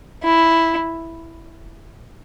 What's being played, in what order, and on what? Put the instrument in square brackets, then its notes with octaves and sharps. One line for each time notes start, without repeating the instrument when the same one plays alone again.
[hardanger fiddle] E4